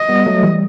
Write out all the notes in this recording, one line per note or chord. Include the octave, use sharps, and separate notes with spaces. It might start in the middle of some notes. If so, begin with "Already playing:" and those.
Already playing: D#5
G3 B3
F#3 A3
E3 G3